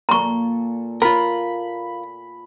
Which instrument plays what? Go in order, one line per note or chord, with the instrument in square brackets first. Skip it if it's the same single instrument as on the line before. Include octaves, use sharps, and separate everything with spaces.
[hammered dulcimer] A#2 A4 [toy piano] A#5 C#6
[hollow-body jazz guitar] F4 A#4 [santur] B5